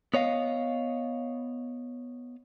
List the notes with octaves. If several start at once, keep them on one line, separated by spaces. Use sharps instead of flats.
B3 C#5 D#5 F5